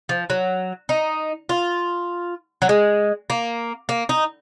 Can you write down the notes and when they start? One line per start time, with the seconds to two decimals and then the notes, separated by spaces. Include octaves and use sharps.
0.09 F3
0.30 F#3
0.89 D#4
1.49 F4
2.62 F#3
2.69 G#3
3.30 A#3
3.89 A#3
4.09 D#4